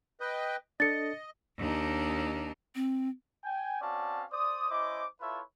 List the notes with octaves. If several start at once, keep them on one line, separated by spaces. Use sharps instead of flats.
B4 D#5 G5
D4 A4 D#5 A6 C#7
D#2 D4 D#4
C4
G5 G#5
C4 C#4 F#4 D5 F5 A5
C5 D5 D#6
C#4 E4 C5 D#5 D6
E4 F4 A4 B4 C#5 E5